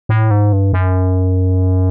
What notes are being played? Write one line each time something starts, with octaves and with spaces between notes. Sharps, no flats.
A2
G#2
G2
F#2